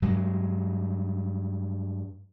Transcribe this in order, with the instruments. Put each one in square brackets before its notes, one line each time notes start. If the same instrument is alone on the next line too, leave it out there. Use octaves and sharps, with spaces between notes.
[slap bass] G2 F#3 G#3